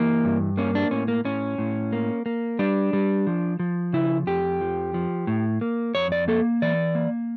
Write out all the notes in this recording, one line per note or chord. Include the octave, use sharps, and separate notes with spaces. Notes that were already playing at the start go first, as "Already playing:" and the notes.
Already playing: E3 A#3
G2
A#3 C#4
D4
A2 C#4
A#3
A2 C#4
A2
A#3
A#3
G3 D4
G3
F3
F3
C#3 E4
F2 G4
F3
F3
A2
A#3
F2 C#5
D5
A#3 A4
E3 D5
A#3